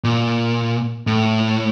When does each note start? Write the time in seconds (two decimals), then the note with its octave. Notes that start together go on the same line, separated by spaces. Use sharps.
0.04 A#2
1.07 A2